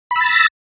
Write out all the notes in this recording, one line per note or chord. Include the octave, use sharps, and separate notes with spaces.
B5 E6 A6 A#6